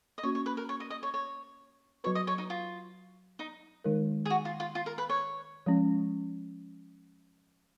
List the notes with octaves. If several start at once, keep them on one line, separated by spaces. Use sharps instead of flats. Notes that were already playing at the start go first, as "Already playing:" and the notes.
D#5
A#3 C#4 F#4 C#5
C#5
B4
A#4
C#5
D#5
D#5
C#5
C#5
F#3 B3 F#4 B4 C#5
D#5
C#5
D#4
F4
D#4
D#3 G#3 D#4 A#4
G#4
F#4
F4
F4
F4
A#4
B4
C#5
F3 G#3 C#4